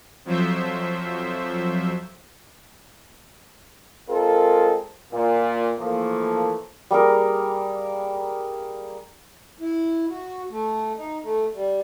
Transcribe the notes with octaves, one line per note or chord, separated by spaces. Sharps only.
F2 F3 F#3 C5 E5
G#3 C4 F4 A4 A#4
A#2
E3 F3 A3 A#3
G3 A#3 G#4 A#4
E4
F#4
A3
D#4
A3
G3